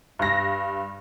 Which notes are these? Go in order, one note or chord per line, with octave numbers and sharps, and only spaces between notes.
G2 A#6